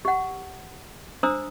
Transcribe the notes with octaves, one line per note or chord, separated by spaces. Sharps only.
G4 F#5
D4 C5 A#5 D#6 E6